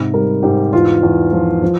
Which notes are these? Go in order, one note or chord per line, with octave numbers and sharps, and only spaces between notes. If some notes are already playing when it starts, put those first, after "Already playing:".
Already playing: G#2 C3
G3 A#4
G#2 G4
E2 F4
E2
F3
F3